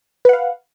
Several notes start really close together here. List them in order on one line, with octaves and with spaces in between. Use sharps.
B4 F#5 F5